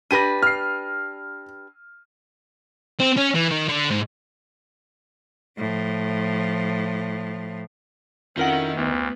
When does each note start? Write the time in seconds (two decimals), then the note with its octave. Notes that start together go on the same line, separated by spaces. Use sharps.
0.11 D4 G4 B4 A#6 D#7
0.42 F6 C7
3.00 C4
3.17 C#4
3.35 E3
3.51 D#3
3.69 D3
3.91 G#2
5.58 A2 F3
8.37 F2 D#3 C#4 E4 A#4 F#5
8.75 D2 B3